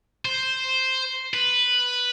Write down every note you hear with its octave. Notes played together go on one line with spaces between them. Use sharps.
C5
B4